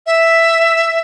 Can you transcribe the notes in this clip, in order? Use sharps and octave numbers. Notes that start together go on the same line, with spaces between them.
E5